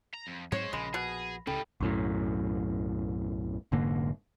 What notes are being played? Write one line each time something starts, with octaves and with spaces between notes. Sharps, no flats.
A#5
F2
G#2 F#3 G#3 C4 C5 C#5
A#1 C#3 G#3 B5 A#6
B2 G#4
C#2 A2 C#3 G3 C#4 A4 G5 B5
B1 F#2 A2
F1 G#2 D3 A#3